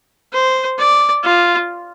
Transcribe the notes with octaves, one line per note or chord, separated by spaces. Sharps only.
C5
D5
F4